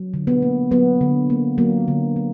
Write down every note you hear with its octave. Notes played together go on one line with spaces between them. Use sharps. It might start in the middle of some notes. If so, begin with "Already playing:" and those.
Already playing: F#3
D3
B3
A#3
F#3 B3
D3
A#3
F#3 A#3
D3
F#3